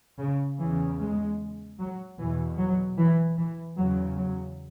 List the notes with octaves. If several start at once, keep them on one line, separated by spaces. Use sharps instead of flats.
C#3
E2 C#3 E3
G#3
F#3
E2 B2 E3
F#3
E3
E3
E2 C#3 F#3
F#3